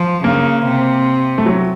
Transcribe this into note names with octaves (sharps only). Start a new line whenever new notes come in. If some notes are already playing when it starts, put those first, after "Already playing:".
Already playing: F3
C#3 A#3
C3
A3
F#3